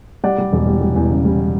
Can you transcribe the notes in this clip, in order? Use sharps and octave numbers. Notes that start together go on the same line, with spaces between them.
G3 D5 F#5
G3
E1
G3
G3
E2
C#3
G3